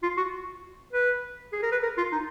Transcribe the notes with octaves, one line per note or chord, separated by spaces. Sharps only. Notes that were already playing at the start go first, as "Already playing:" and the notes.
F4
F#4
B4
G#4
A#4
B4
A#4
F4
D#4